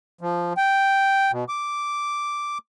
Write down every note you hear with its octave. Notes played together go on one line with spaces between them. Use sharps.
F3
G5
B2
D6